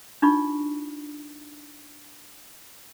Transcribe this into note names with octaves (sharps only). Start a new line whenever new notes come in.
D4 D#4 F4 C#6